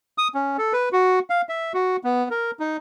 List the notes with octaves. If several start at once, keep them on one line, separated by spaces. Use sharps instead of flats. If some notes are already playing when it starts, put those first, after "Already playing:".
D#6
C#4
A4
B4
F#4
F5
E5
F#4
B3
A#4
D#4